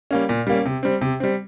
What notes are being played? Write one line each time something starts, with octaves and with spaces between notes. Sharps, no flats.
G3 A#3 C#4
A#2
G3 A#3 C#4
C3
G3 C4
C3
G3 C4